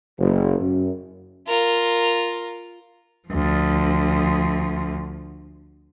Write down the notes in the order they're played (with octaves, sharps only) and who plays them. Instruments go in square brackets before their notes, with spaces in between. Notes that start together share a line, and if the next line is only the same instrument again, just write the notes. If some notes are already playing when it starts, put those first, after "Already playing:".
[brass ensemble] F#1
F#2
[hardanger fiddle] F4 A#4
[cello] D2 F3